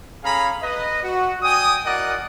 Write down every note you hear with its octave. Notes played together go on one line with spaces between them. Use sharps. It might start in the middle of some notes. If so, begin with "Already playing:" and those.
C#4 G#4 A4 F5 A#5 B5
B4 D#5
F#4
D5 G5 G#5 D#6
E4 F#4 A#4 D5 D#5 F#5